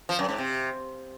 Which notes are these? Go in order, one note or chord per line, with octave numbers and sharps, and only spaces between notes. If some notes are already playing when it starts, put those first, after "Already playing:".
F3
F#2
G#2
C3